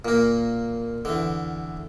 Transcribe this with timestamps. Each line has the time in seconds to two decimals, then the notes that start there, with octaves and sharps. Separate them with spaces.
0.05 A#2 A#3
1.05 E2 D3